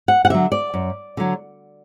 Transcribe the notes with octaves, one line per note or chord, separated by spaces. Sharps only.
F#5
F#5
D3 F#3 E5
D5
F#2
D3 F#3